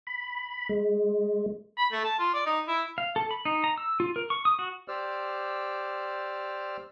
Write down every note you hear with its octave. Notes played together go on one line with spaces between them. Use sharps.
B5
G#3
B5
A3
A5
F4
D5
D#4
E4
F5
A4
B5
D#4
A#5
E6
F4
A#4
C#6
D#6
F#4
G4 C5 D5 E6 F6